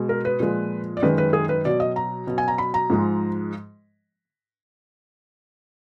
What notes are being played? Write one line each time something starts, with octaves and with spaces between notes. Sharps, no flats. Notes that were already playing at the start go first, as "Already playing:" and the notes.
Already playing: B2 G#3
A#4
B4
A#2 F3 G#3
D5
F#2 D#3 G#3 B4
B4
G#4
B4
B2 F#3 D5
D#5
A#5
B2 F#3
G#5
A#5
B5
A#5
G#2 F3 G#3